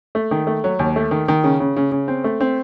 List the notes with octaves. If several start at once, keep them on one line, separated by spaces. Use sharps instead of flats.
A3
D#3
A3
F#3
D#2
A3
D#3
D#3
C#3
C#3
C#3
C#3
C4
A3
C4